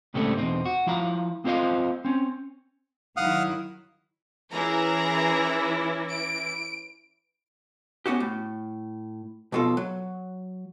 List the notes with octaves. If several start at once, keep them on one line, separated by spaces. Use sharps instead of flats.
C#2 A2 C#3 G3 A3 C4
E2 B2 C4 D#4
F#4
F3 E4 F5 A#5
A#3 C4 F4 C5 D#5 F5
C4 C#4
D#3 F#3 E4 F5 F#5 D#6
E3 C#4 E4 G#4 A#4 A#5
D7
B3 C#4 F#4 G4
A2
B1 F2 B2 F4 A4
F#3